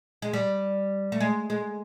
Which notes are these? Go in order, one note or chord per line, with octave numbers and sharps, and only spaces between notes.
G#3
G3
A3
G#3
G#3